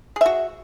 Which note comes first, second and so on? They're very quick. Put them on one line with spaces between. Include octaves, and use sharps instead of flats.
G#4 E5 F#4